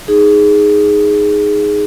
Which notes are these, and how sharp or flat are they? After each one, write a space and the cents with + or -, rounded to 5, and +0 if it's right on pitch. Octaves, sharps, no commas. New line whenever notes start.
D#4 +0 G#4 +0